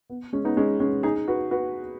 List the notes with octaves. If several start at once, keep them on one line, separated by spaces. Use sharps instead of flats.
B3
G#3 C#4
B3 D#4
G#3 C#4
G#3 C#4
D#4 G#4
F#4 B4
F#4 B4